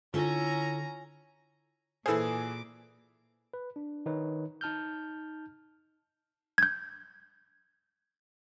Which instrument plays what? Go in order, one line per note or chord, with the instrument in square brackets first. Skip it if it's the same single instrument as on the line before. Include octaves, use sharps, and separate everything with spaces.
[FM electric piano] D3 [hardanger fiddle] C#4 A#5 [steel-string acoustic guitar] E4 A4 C#5 [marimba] F4
[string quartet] A#2 D6 [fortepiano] E3 G#4 [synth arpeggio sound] E4 A4 C5
[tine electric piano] B4
D4
D#3 D#4 B4 C#5
D#4 A5 F6 G6
[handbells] G6 G#6